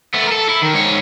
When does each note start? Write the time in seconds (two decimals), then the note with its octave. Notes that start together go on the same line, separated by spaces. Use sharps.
0.14 A3 B3
0.27 A4 A#4
0.50 E4
0.63 D#3
0.74 G#2 C#5